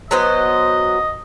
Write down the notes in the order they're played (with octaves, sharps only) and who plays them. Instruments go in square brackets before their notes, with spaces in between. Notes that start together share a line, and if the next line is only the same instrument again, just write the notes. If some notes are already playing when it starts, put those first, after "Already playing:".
[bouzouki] F#3 B3 C5 [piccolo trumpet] D#5